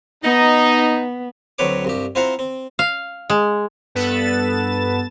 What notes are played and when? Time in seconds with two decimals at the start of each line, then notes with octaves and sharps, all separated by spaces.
0.24 B3 D#4
1.59 D2 F#3 C4 B4 C#5 D6
1.85 C2 G2 G4
2.15 C4 E4 F4 C5 F#5 A#5
2.39 C4
2.79 F5
3.30 G#3
3.95 G2 B3 A4 B4 A6 E7